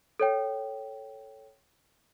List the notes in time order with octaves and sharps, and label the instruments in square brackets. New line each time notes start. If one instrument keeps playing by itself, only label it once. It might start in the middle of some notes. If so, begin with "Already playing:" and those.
[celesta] A4 C#5 G5